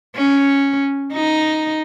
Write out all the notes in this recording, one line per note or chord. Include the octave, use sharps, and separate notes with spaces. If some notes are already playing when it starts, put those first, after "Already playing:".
C#4
D#4